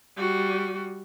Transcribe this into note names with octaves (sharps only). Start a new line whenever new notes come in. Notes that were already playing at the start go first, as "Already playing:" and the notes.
G3 F#4